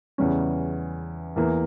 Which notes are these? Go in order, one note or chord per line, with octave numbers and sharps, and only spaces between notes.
E2 C#3 G3 C#4
E2 E3 A#3